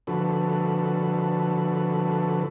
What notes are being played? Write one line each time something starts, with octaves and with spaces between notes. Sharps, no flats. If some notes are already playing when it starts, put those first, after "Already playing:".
D3 F3 F#4 A4 B4